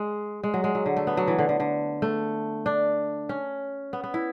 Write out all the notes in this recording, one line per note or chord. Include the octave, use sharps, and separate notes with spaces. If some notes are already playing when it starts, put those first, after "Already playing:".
Already playing: G#3
G#3
F#3
G#3
F#3
D3
A3
B3
F#3
E3
D3
D3
D3
A3
D4
C#4
B3
B3
E4